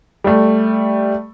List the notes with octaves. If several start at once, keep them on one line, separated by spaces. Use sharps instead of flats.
G3 A3